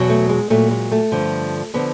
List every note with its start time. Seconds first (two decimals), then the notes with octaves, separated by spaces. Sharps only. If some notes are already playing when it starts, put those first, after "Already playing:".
Already playing: E2 B2 F#3
0.10 A3
0.29 G#3
0.50 A#2 F#3 A3
0.71 G#3
0.92 A3
1.12 G2 D3 F3
1.74 D3 F3 B3